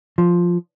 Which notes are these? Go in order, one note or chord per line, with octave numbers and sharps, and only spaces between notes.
F3